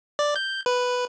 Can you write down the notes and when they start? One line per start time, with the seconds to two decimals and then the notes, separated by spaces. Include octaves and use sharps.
0.19 D5
0.36 G6
0.66 B4